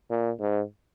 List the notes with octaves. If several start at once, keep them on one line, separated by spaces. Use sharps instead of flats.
A#2
G#2